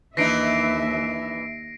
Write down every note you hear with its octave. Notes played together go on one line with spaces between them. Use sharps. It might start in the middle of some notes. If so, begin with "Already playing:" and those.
D#2 E3 D4 D#4 E5 A#6 C7 D7